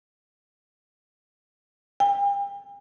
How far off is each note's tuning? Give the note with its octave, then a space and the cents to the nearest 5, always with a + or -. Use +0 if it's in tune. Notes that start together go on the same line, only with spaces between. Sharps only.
G5 +40